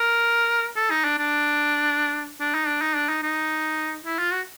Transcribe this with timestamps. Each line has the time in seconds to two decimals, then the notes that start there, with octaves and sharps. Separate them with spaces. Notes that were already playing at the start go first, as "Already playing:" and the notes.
Already playing: A#4
0.76 A4
0.90 D#4
1.04 D4
1.18 D4
2.40 D4
2.54 D#4
2.67 D4
2.81 D#4
2.96 D4
3.09 D#4
3.23 D#4
4.05 E4
4.19 F4
4.32 F#4